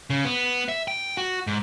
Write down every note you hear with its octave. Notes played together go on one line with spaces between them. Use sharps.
C#3
B3
E5
G5
F#4
G#2